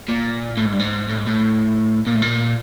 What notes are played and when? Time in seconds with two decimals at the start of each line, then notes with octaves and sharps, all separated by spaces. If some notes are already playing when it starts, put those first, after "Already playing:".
0.09 A#2
0.57 A2
0.66 G#2
0.73 G2
0.79 G#2
1.08 A2
1.17 G#2
1.26 A2
2.07 A#2
2.15 A2
2.22 A#2